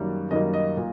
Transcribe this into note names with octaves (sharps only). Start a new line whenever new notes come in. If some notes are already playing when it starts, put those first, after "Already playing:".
Already playing: F#2 D#3 G3 A#3
F#2 D#3 G3 A#3 D#5
D#5
A#2